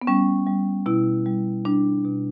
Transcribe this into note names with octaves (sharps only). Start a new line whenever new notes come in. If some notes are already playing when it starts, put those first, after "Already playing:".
B3
G3 C#4
G3
B2 E4
G3
G3 D4
B2